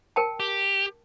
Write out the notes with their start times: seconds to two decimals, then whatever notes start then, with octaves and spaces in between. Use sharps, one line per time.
0.16 A#4 G5 A5
0.40 G4